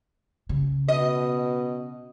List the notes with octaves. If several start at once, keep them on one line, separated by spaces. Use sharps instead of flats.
C#3
B2 D#5